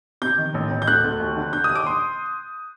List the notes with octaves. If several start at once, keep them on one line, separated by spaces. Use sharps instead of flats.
C3 G6
D#3
A1
A1
G6
D2 F#6
D2
D#2
D3
D3 G6
D#6
D#2
D6
C6